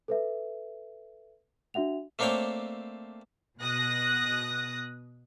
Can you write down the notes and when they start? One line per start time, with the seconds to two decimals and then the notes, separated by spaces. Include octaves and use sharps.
0.08 A4 B4 E5
1.74 D4 F#4 E5 F#5 F7
2.19 A3 A#3 C4 D4 C#5 G5
3.59 B2 D#6 F#6 A#6